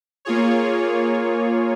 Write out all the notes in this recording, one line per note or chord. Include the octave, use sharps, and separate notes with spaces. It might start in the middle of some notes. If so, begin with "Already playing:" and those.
A#3 F4 G#4 C#5